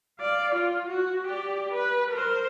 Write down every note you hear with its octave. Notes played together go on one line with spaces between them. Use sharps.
D5 F5
F4
F#4
G4 D5
B4
A#4 C5